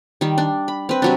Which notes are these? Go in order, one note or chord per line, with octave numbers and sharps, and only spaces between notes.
D#3 G3
D4
B5
C4 B4
C3 F#3 D4